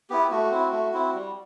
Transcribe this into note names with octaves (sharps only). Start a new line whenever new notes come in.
B3 E4 G4
A3 F#4
C4 E4
A3
C4 E4
G3